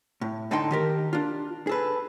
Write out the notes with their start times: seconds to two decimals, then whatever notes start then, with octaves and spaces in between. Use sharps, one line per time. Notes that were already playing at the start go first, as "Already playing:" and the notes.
0.21 A2
0.51 A2 D3 D#4 A4 G5 C6
0.71 D#3 G4 A#4
1.13 D4 F4
1.67 G#4 A4 B4